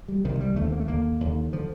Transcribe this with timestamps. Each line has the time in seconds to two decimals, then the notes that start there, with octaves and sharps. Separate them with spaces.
0.08 G3
0.25 C2 C3 D#3
0.41 G3
0.56 D#2 D3 A3
0.65 C4
0.72 A#3
0.80 A3
0.88 D#2 D3 A#3
1.20 D#2 D3
1.53 D3 F3